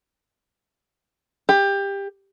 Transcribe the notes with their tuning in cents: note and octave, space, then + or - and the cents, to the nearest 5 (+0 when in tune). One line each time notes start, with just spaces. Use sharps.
G4 +20